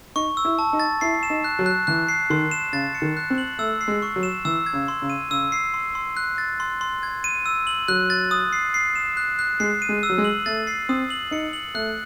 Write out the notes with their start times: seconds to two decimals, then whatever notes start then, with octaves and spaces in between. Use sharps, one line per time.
0.16 D#4 C#6
0.37 E6
0.45 E4
0.59 A5
0.73 D#4
0.80 A6
1.01 E4 C7
1.23 E7
1.30 D#4
1.44 F#6
1.59 F#3
1.66 F#6
1.87 E3 F#6
2.09 C7
2.30 D#3 C6
2.51 E7
2.73 C#3 A6
2.95 C#7
3.02 D#3
3.17 F#6
3.30 C4
3.38 F#7
3.59 A3 E6
3.81 C7
3.88 G#3
4.02 C#6
4.16 F#3
4.23 E7
4.45 E3 E6
4.66 G#6
4.73 C#3
4.88 C6
5.02 C#3
5.10 D#7
5.31 C#3 E6
5.52 C7
5.74 C6
5.95 C6
6.17 F#6
6.38 A6
6.60 C6
6.81 C6
7.03 G#6
7.24 D#7
7.46 E6
7.67 F#7
7.88 F#3 F#6
8.10 A6
8.31 D#6
8.53 C7
8.74 C7
8.96 E7
9.17 F#6
9.39 F#6
9.60 G#3 C7
9.82 D#7
9.89 G#3
10.03 E6
10.09 F#3
10.18 G#3
10.24 F#7
10.46 A3 A6
10.67 C7
10.89 C4 D#6
11.10 F#7
11.31 D#4 C#7
11.53 F#7
11.74 A3 F#6